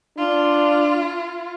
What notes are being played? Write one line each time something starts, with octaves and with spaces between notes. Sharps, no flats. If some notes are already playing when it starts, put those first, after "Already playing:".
D4 F4